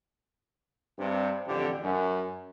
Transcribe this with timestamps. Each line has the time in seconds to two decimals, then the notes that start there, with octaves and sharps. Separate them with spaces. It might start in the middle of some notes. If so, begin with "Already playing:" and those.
0.98 G2 C3
1.46 A1 F2 D3 G4
1.83 F#2